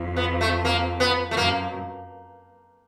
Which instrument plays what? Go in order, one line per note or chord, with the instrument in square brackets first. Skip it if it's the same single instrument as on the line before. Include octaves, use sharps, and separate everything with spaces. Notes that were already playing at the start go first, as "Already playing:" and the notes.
Already playing: [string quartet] F2
[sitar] B3
A3
A#3
B3
A3
[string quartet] F#2 [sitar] A#3